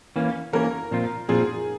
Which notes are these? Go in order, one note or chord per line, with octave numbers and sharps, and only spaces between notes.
E3 A#3 C#4
E3 A#3 C#4 A#4
A#2 F3 C4 F4
A#2 F3 C4 F4 G#4